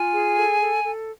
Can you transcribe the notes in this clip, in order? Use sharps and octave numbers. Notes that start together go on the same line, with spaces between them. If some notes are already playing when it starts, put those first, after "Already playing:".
Already playing: F4 G#5
G#4
A4
A4
A4